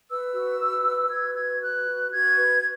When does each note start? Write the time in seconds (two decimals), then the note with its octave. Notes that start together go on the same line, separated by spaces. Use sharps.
0.10 B4 E6
0.34 F#4
0.60 B4
0.86 F#4
1.10 B4 G#6
1.35 F#4 G#6
1.61 B4 F#6
1.86 F#4
2.12 F#4 G#6
2.37 B4